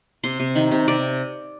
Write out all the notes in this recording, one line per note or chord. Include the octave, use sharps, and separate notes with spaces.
C3 C6
C3
D#3
C3
C3 D5